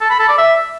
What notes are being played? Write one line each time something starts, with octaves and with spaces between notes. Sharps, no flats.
A4
B5
A4
D5
E5